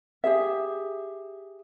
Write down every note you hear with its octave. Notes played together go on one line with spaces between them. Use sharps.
G4 G#4 E5